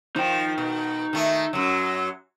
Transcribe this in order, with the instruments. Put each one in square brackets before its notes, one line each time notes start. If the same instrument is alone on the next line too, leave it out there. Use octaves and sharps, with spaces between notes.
[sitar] F3 [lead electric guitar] D#4 G5
[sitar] B2
D#3 A3
F#2 F#3